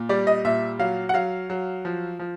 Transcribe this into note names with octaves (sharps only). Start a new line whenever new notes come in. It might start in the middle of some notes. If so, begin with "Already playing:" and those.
Already playing: A#2
G3 D5
D#5
A#2 E5
F#3 F5
F#5
F#3 F5
F#3
F3
F3